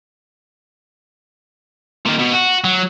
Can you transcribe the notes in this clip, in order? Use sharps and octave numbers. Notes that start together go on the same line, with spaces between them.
A#2 D#3
B2
F#4
F#3